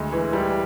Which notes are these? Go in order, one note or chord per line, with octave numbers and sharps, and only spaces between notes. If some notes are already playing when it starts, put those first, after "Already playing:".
Already playing: D2 G#3
E3
G3